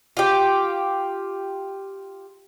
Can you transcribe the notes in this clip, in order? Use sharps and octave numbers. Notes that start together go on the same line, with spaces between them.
F4 G4